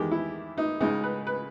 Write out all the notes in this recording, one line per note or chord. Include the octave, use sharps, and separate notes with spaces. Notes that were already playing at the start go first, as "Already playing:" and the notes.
Already playing: E2 D#3 G#3 G4
E4
D#4
C#2 C#3 G#3 D#4
B4
B4